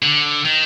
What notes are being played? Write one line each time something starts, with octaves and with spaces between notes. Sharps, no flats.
D3
D#3